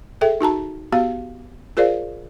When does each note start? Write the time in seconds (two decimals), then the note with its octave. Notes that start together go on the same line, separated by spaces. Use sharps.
0.21 G#4 A4 E5 G5
0.41 D#4 F#4 A5 A#5
0.92 B3 F#4 G4 F5
1.77 F4 G#4 A#4 C5 D5 F5